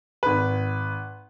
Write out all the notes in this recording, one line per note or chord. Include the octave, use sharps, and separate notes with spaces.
G#1 B4